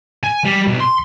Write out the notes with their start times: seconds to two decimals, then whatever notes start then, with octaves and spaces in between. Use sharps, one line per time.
0.23 G#5
0.45 G3
0.67 B1
0.80 C6